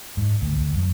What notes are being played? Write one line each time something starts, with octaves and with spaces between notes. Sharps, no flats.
G#2
D2
D2
F#2